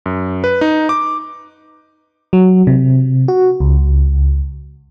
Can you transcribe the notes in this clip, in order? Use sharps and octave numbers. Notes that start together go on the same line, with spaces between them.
F#2
B4
D#4
D6
F#3
C3
F#4
C#2